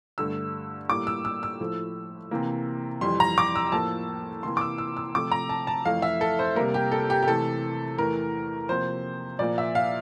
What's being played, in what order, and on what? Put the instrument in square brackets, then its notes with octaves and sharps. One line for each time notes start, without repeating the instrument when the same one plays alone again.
[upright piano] G2 D3 A3 E6
A2 G3 A#3 D6
E6
E6
E6
A2 F3 A3
C3 E3 A#3
F2 E3 G3 C6
A#5
D6
E6
A2 F3 A#3 A5
C3 E3 A#3 C6
D6
E6
E6
E6
C3 F3 A3 D6
A#5
A5
A5
F2 E3 A3 F5
E5
A4
C5
C3 G3 A#3 A#4
G4
A4
G4
G4
C3 E3 A3 A4
E2 E3 A3 A#4
C3 F3 A#3 C5
A#2 F3 A#3 D5
E5
F5